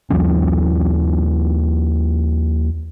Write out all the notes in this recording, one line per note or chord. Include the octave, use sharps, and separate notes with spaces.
D#2 F3 G3 C#4